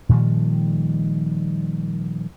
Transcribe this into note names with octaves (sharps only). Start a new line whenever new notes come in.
A#2 D#3 F3 G3